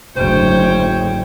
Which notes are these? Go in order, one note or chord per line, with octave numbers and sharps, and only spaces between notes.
F#1 D2 G#2 C5 C#5 G5